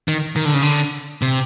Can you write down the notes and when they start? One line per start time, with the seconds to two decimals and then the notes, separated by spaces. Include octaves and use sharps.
0.08 D#3
0.36 D#3
0.45 D3
0.54 C#3
0.62 D3
1.22 C3